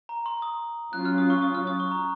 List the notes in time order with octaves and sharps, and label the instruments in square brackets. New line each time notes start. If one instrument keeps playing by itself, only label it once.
[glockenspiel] A#5
C6
D#6
[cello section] F#3 C#4 F4 [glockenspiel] F#6
[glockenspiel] F6
D#6
C#6
D#6
F6
D#6
C#6
A#5